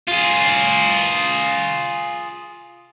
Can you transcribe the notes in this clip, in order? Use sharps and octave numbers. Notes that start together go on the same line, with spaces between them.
F4 G#4